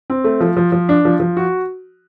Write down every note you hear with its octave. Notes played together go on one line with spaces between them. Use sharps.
C4
A3
F3
F3
F3
D4
F3
F3
F#4